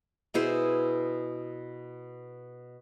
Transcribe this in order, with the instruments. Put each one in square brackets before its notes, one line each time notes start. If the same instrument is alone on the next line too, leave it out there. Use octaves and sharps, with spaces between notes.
[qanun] B2 E4 G#4 C5